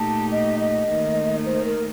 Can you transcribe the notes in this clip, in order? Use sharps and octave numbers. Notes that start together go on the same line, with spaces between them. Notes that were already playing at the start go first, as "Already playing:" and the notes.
Already playing: A#2 A3 D#4 G4 A5
D#5
D#5
D#2 D#3 A3
C5
A#4